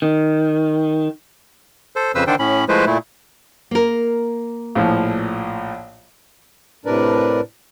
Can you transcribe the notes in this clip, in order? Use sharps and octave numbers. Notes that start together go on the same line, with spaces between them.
D#3
A4 C5
F2 C#3 B4 C5 E6
D3 D#3 D4 A4 C5 G5
A2 C#4 B5
F3 G#3 A3 E4 B4 C5
A#2 A3 E4
A#3 A#4
A#1 A2 F3
A2 C3 D4 A#4 B4 D5